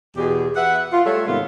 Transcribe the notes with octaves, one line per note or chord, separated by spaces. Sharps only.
E2 B2 G4 G#4
B4 E5 F#5
F4
G3 A3 A4 C#5 E5
G#2 C3 D#3 B3 F4